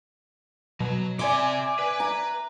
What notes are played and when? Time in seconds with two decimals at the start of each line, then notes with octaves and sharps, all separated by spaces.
0.80 B2 F#3
1.19 C3 D5 E5 G#5 C6 D6
1.79 B4
2.00 A#5